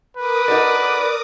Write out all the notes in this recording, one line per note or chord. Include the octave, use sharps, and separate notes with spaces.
A#4 B4 D6 D#6
D#4 F#4 A4 D5